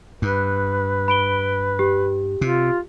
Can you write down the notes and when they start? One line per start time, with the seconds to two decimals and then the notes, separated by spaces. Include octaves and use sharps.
0.22 G2 B4
1.08 B5 D7 G7
1.79 G4
2.41 C3 F4